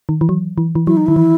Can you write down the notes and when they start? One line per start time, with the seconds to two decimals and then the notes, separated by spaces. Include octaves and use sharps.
0.09 D#3
0.21 E3
0.29 F#3
0.58 E3
0.75 E3
0.87 F#3 E4
0.97 D#4
1.06 D#3 E4
1.16 E3